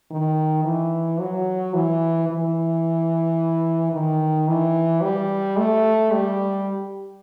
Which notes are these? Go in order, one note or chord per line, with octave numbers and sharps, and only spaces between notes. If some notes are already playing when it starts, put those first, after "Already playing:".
D#3
E3
F#3
E3
E3
D#3
E3
G3
A3
G3